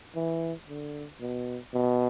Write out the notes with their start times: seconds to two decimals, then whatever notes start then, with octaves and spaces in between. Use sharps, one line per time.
0.15 E3
0.69 D3
1.21 B2
1.74 B2